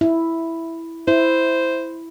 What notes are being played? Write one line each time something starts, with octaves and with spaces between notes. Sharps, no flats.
E4
E4 C5